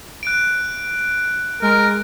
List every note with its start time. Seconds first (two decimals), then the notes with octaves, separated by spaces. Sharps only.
0.23 F#6 D7
1.62 G#3 A#4